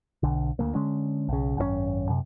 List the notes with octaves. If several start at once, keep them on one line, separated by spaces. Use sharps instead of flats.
B1 D3
D2 F#3 A#3
D3 G#3 C#4
B1 C#3
G#1 F#2 D3 C#4
F#2 C3